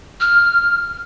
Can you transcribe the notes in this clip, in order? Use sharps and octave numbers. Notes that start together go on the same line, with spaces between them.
F6